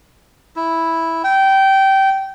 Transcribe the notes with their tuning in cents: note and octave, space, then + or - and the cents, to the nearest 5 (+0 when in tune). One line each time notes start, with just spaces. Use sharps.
E4 -5
G5 -20